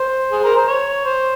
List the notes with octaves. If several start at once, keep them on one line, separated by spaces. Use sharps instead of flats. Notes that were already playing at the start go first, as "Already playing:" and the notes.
Already playing: C5
G#4
A#4
C5
C#5
C5